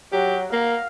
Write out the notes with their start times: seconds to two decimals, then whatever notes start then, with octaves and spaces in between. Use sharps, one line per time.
0.12 F#3 G4
0.53 A#3 F5